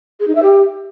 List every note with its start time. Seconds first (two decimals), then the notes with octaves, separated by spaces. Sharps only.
0.20 G#4
0.27 D#4
0.35 E5
0.42 G4